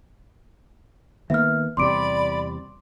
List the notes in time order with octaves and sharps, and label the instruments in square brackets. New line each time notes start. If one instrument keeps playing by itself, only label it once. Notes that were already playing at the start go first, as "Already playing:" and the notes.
[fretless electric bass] D#3 A#3 B3 [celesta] E5 F6
[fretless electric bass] E2 C3 G3 [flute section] D5 B5 [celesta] C6 D6 D7